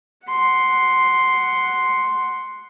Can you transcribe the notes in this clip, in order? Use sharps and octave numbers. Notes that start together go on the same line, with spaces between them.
F#5 C6